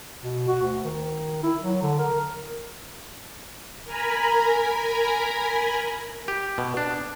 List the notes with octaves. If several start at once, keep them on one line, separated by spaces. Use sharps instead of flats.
B2
F#4
D2
D#3
E4
F#3
D3
A#4
A#4 G#5 A#5 B5
G4
B2
D4